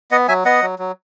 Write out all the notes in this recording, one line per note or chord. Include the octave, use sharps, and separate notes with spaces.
B3 D#5 F#5
F#3 E5 G#5
B3 D#5 F#5
F#3
F#3